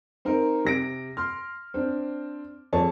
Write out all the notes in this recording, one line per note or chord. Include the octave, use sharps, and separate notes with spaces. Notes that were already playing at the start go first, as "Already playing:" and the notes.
C4 D#4 A#4
C3 A#6 D7
C6 F6
C4 D4
F2 G#4 C#5 A5